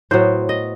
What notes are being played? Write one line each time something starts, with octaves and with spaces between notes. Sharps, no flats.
A2 F#3 B3 C5
D#5